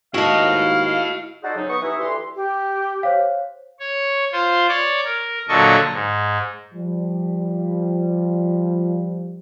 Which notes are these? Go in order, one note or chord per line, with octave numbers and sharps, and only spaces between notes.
D#2 G#2 D#3 E4 F#4 D#5 F5 A5
D#4 F#4 G#4 A4 C5 D5
G#2 C#3 F#3 D#4
B3 C#6 D#6
C3 E3 D#4 E4 E5 D#6
D2 E3 G4 C6
G4
C5 C#5 F5
C#5
F4 C5 C6
C#5 D5 D6
A#4
A#2 D3 F#3 A4 D#5 C#6
G#2
F3 G3